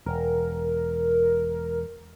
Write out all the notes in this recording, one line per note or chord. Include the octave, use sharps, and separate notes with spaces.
E1 A#4